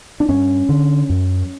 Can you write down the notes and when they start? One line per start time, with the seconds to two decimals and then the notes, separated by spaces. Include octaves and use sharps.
0.20 D4
0.29 G2 C#4
0.69 D3
1.10 F#2